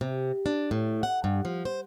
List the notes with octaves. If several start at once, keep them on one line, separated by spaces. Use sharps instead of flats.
C3
D4
A2
F#5
G2
F3
C5